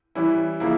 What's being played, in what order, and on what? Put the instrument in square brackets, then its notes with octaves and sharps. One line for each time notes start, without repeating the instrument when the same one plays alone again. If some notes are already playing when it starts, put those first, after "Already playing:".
[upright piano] E3 G3 C#4 E4
C#3 F3 A#3 E4